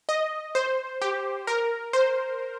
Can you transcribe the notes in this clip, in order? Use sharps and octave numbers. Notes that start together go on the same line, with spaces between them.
D#5
C5
G4
A#4
C5